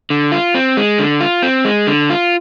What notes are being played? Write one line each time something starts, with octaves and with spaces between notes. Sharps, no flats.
D3
F4
C4
G#3
D3
F4
C4
G#3
D3
F4